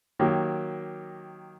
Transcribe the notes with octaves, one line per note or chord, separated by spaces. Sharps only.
D#3 F#3 A#3 G4